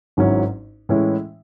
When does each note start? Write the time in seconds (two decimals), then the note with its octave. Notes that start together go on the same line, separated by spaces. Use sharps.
0.17 G#1 G#2 F#3 C#4 E4
0.89 A2 E3 G#3 C#4 E4